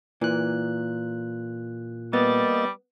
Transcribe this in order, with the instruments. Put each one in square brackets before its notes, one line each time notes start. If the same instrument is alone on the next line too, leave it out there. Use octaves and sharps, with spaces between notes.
[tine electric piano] A#2 F#6 [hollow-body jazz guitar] E3
[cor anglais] G3 [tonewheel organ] A#3 D#5 A6 [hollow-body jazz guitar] B3